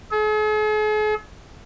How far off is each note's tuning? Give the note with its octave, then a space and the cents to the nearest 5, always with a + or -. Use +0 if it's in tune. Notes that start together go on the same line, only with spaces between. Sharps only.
G#4 +45